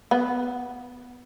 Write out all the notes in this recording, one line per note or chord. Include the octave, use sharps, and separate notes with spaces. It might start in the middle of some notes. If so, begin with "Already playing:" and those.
B3